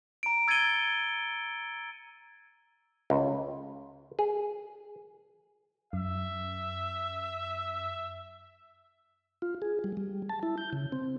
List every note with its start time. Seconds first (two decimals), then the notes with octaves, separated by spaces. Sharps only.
0.23 A#5 D7
0.48 E6 G#6 A6 C#7 D#7 G7
3.10 C#2
4.19 G#4
5.93 F#2 E5
9.42 F4
9.62 G#4
9.84 G3
9.97 G3
10.29 A5
10.43 E4
10.58 G6
10.73 C#3
10.92 C4